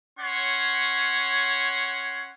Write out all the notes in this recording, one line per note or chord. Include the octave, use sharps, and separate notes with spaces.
C#4 C#5 F#5 C6